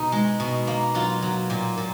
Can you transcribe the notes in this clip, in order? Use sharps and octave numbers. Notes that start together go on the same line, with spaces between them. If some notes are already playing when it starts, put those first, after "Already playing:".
Already playing: B2 D#4
G#3
B2
A#3
F#3 F4
F#3
A#2
A#2